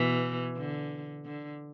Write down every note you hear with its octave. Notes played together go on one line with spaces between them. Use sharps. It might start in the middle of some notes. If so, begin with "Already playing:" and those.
Already playing: B2 E3
D3
D3